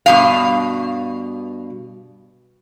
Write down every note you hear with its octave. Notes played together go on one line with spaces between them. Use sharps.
G2 B2 F5